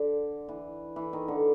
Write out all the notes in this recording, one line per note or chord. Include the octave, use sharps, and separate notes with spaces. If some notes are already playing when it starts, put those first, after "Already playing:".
Already playing: D3
E3
E3
D#3
D3